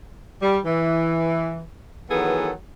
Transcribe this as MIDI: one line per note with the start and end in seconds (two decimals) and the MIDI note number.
0.42 0.58 55
0.65 1.63 52
2.11 2.50 51
2.11 2.50 52
2.11 2.50 54
2.11 2.50 59
2.11 2.50 68
2.11 2.50 69